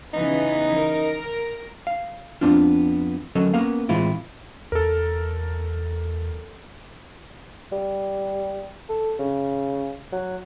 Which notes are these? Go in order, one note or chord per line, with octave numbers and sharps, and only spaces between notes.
C#3 E3 B3 D#4
A#4
F5
F2 C#3 B3 C4 D4 F4
D2 F#3 C#4 A4 A#4 D#5
A#3 B3 C#4 A#4 F5
A2 E3 G#3 C4 E4 F4
E2 A4 A#4
G3
A4
C#3
F#3